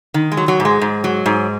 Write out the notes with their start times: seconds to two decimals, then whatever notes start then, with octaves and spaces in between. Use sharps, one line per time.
0.14 D#3
0.32 G#3
0.37 F#3
0.48 F#3
0.60 G#2
0.65 G#3
0.81 G#2
1.04 F#3
1.26 G#2